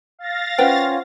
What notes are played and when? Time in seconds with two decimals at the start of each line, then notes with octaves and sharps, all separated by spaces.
0.19 F5 A6 A#6
0.58 C#4 F4 B4 C5 F#5 G5